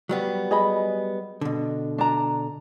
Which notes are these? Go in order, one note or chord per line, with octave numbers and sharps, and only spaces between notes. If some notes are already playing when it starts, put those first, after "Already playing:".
F#3 G3 B3
G#4 D#5 B5
B2 D3
D4 A#5